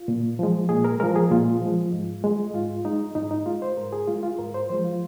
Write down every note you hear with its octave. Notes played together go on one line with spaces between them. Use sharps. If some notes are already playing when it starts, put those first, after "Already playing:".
Already playing: F4
A#2
F3 G#3
A#2 G#4
A#4
F3 G#3 A#4
G#4
A#2 F4
F3 G#3
G#2
G#3
G#2 F4
G#3 D#4
G#2 D#4
D#4
G#3 F4
C5
G#2 A#4
G#4
G#3 F4
F4
G#2 A#4
C5
F3 G#3 C5
F4